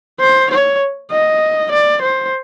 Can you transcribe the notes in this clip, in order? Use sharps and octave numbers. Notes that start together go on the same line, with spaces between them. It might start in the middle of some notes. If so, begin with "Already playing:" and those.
C5
C#5
D#5
D5
C5